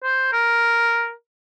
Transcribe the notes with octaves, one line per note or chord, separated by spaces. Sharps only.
C5
A#4